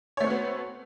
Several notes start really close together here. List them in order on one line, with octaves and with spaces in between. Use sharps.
C#5 A3 C4 F#4 B3